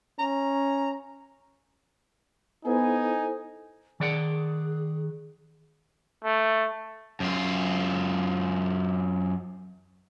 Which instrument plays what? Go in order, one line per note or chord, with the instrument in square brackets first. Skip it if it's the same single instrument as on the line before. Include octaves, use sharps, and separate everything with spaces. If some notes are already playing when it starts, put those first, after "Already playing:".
[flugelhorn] C#4 [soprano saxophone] A#5
[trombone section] B3 [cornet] D#4 [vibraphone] E4 A4 C5 [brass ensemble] G#5
[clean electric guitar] D#3 D5 F#5 [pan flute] G#4
[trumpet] A3
[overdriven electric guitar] F#2 F4